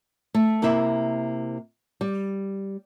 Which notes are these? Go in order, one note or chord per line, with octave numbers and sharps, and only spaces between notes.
A3
C3 A#3 E4 E5
G3